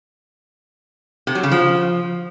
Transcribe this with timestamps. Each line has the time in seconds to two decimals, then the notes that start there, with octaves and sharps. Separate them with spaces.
1.27 C3
1.35 F#3
1.43 C#3
1.52 F3